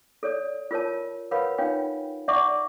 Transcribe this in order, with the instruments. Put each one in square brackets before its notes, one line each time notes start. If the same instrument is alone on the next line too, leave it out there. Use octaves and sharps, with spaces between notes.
[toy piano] A4 C#5 D5
F4 A#4 C#5 A5
A#4 B4 C#5 F5 F#5 B5
D4 D#4 F4 C#5 F5 G5
D4 D5 E5 F#5 C#6 D6